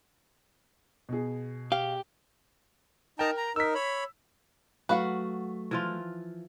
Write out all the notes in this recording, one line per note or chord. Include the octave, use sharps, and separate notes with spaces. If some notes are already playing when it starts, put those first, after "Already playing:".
B2 G#4
G4 F5
D#4 A#4 G5 A5 A#5
A#5
D#4 A#4 E6 B6
C#5 B5
F#3 A3 F#4 B4 F5 F#5
E3 F3 F4